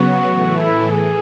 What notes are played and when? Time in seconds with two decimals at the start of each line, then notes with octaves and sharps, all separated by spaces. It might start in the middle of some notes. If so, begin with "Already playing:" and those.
Already playing: C#3 F#3 B3 F#4
0.24 A2 E3 A3
0.57 E4
0.90 E3 G#4